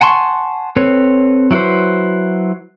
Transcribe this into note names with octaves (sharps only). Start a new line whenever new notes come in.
F#5 G#5 A5 C6 C#6
C4 A4 B4 C#5
F#3 E4 F#4 B4 C5